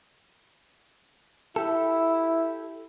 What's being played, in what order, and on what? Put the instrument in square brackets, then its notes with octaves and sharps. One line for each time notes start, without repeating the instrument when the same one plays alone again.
[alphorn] E4 [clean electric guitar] G4 A4